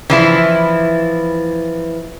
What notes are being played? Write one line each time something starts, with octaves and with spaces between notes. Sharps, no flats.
E3 F3 E4